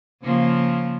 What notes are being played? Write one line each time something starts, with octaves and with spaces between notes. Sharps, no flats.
C#3 F3 A#3